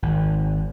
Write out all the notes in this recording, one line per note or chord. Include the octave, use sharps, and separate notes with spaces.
G#1